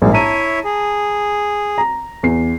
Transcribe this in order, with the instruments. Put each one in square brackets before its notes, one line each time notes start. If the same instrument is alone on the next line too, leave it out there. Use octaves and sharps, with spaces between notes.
[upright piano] A#1 G#2 [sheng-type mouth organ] A#3
[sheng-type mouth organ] E4 C#5 E5 [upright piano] A5 A#5 D#7
[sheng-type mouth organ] G#4
[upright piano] A#5
E2 C7